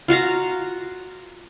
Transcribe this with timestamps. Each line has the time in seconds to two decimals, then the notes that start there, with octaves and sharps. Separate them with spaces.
0.08 F4 F#4 F5 A#5